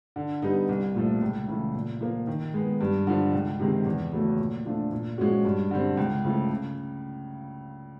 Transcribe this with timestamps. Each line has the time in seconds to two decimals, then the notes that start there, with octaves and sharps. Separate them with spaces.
0.16 D3
0.42 G3 B3 D#4
0.69 C2
0.95 A#2 F3 A3
1.22 C#2
1.48 C#3 E3 A3
1.74 A#2
2.01 F3 A#3
2.27 D#3
2.54 G#3 B3
2.81 G2
3.07 D3 F3
3.33 C#2
3.60 C3 D#3 G#3 C4
3.85 E2
4.13 C#3 F#3 A3 C#4
4.39 A#2
4.65 F3 A3 D4 F4
4.91 A#2
5.18 F3 G#3 C#4 F#4
5.45 G2
5.71 D3 G3 C4
5.97 C#2
6.24 C#3 F3 A3
6.51 C#3